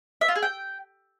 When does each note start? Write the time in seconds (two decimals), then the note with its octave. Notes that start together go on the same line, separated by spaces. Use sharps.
0.21 E5
0.28 F4
0.35 G#4
0.43 G5